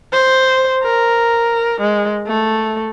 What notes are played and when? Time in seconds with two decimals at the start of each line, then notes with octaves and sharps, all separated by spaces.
0.13 C5
0.83 A#4
1.82 G#3
2.27 A3